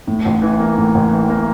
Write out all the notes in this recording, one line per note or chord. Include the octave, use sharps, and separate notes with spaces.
A2
A1
E3
A#3
A2
A1
E3
A#3